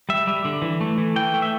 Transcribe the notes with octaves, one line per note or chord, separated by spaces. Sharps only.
G3 E5
G3
D3
E3
A3
E3
E3 G5
A3
E5